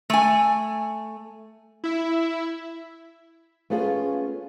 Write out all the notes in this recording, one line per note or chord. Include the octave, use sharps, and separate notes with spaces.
A3 G#5
E4 E5
A3 B3 C#4 F4 G#4